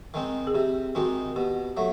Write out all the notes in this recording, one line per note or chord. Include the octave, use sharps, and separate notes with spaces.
D#3 G#3 C4
G#4
C3 G4
D#3 G#3 C4 F#4
B2 G4
F#3 A3